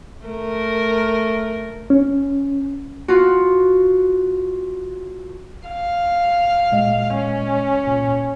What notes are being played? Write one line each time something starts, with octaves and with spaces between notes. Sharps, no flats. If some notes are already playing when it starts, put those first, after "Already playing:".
A3 A#4
C#4
F4 F#4
F5
A#2 G#3 D#5
C#4
C#2 A#2